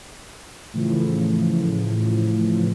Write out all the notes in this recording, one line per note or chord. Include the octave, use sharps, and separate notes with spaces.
A2 C#3 E3 F3